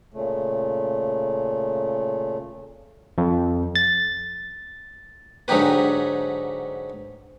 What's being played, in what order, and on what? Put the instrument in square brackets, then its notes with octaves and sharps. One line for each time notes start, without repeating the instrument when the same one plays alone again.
[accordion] A#2 C#3 A3
[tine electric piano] F2
A6
[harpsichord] G#2 D3 F#3 D#4 G4 B4